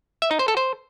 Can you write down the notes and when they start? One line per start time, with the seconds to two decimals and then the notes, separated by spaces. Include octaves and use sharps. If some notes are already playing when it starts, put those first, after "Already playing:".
0.22 E5
0.31 D#4
0.39 C5
0.48 A4
0.57 C5